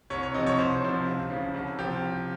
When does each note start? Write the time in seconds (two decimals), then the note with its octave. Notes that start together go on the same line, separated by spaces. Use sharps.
0.10 C2 C#5
0.23 C#5
0.34 C3 F3 D#5
0.47 C#5
0.59 C2 C5
0.82 C3 F3
1.06 C#2
1.30 C#3 F3
1.54 C2
1.78 C3 F3 G4